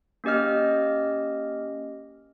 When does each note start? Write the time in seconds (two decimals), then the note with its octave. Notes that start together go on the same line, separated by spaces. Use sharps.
0.24 A#3 C#4 G4 D#5 F6